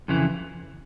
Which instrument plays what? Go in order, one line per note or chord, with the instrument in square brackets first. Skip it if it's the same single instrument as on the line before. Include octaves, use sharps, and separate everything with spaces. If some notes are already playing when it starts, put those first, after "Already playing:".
[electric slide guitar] F2 C#3 E3